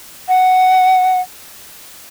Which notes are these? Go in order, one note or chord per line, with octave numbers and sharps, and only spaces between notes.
F#5